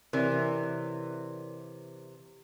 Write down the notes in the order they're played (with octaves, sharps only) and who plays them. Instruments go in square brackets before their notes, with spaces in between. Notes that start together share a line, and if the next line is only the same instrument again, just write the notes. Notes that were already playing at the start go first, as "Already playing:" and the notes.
[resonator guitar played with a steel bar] C3 E3 [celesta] A#4 C#5 D5